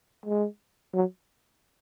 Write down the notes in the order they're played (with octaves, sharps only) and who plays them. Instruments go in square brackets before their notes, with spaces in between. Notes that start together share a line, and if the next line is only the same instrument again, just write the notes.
[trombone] G#3
F#3